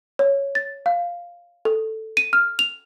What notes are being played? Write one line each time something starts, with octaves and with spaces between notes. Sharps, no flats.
C#5
A6
F5
A4
D#7
F6
F7